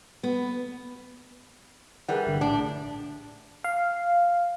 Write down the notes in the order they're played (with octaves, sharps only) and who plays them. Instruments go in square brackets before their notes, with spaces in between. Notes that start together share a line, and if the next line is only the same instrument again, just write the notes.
[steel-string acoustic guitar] B3
[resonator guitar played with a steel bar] E3 G3 [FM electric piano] G#4 A#4 F#5
[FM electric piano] G1 D3
[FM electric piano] A#1 A2 [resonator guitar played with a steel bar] D4
[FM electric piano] F5